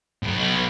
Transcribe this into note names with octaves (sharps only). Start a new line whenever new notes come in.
B1